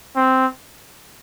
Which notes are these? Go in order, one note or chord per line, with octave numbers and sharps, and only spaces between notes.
C4